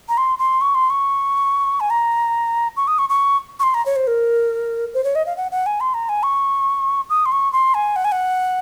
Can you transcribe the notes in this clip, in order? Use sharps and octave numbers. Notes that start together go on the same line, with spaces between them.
A#5
C6
C6
C#6
C6
C#6
G#5
A#5
C#6
D#6
C#6
C#6
C#6
C6
A#5
C#5
C5
A#4
C5
C#5
D#5
F5
F#5
F#5
G#5
C6
A#5
G#5
C#6
D#6
C6
C#6
C6
G#5
F#5
G#5
F#5